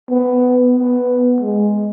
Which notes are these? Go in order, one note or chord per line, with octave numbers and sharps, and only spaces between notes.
B3
B3
G#3